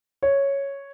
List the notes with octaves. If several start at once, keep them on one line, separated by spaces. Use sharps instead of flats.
C#5